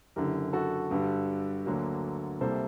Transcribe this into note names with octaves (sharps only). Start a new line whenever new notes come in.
F#1 F#2 D3 G4 A#4
F#4 A4
G2 D3 G3
D2 D3 F#3 A#3
C2 C3 G3 A#3 A4 C5